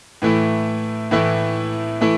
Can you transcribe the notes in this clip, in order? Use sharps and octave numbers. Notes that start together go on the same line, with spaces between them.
A2 E3 A3 E4
A2 E3 A3 E4
E3 A3 E4